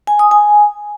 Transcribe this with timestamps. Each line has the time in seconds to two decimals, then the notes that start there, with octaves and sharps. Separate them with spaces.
0.07 G#5
0.19 D#6
0.31 G#5